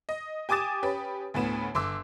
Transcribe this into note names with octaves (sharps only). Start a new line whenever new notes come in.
D#5
G4 G#5 D6 D#6 A6 E7
C#4 G4 B4
D2 A2 B3 E7
G1 C6 D6 E6